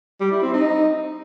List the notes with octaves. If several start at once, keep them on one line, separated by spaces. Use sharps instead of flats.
G3
E4
C4
D#4